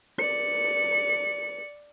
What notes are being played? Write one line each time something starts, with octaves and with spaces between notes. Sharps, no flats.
D5 C#7